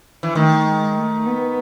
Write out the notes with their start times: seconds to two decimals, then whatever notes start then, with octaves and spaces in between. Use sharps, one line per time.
0.23 E3
0.35 D#3 A3
0.66 G#3
0.96 A3
1.26 B3